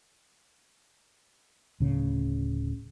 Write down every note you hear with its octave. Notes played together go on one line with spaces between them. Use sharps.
D1 C#3